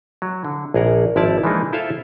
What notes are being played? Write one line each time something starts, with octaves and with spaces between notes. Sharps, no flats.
F#3
D3
A#1 G#4 A#4 F#5
G#1 F3 E4 C#5 D5 A5
E3 F3 G#3 A#3 D4 D#4
E4 F4 A4 C5 E5 F5